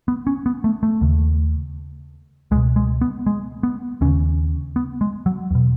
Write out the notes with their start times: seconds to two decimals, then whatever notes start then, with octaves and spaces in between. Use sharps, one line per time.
0.08 B3
0.27 C#4
0.46 B3
0.64 A3
0.83 A3
1.01 D#2 C#3
2.51 C#2 G#3
2.56 B2
2.76 G#3
3.01 B3
3.26 G#3
3.63 B3
4.01 D#2 C#3 C#4
4.76 B3
5.01 G#3
5.26 F#3
5.51 E2 B2